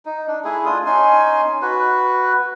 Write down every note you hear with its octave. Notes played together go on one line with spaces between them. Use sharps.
D#4
D4
A3 E4 G#4
D4 F4 D#6
C#4 D#4 G#5 C6
F#4 B4